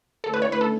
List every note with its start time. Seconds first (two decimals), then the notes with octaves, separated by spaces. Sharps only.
0.24 D3 A3 C#4 E4 A4
0.34 B4
0.42 C#5
0.52 B4
0.61 A4